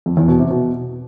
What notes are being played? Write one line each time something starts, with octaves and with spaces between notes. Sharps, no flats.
F2
E2
B2
C3
B2